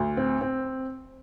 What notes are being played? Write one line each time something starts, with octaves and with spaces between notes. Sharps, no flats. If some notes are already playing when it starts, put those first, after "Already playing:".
Already playing: D2
C4
C4